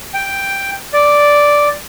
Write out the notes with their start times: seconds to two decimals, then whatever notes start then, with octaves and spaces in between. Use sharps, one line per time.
0.14 G5
0.93 D5